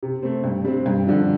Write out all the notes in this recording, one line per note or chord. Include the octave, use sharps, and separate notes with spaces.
C3
A3 C4
G2
G3 C4
G2
D3 F3